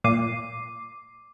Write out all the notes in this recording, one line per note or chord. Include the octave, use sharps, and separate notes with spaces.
A#2 D6 C7 D#7